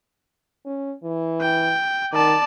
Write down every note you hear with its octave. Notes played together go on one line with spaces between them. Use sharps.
C#4
E3
G5
D#3 D5 A5